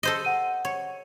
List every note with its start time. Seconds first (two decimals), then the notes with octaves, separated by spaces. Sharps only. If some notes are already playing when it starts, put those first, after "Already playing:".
0.03 A4 C5 D#5
0.25 F#5 D#7
0.65 C#5